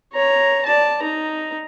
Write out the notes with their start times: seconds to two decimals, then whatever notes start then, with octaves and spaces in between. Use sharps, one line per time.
0.13 C#5 A#5
0.66 D5 A5
1.02 D#4 A#5